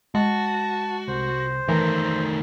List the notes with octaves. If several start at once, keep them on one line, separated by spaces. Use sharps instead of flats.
G#3 F#4 A5
C2 C5
D#3 E3 A3 A#4